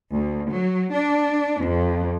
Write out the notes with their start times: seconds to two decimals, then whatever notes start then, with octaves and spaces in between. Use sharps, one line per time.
0.14 D2
0.51 F#3
0.94 D4
1.65 F2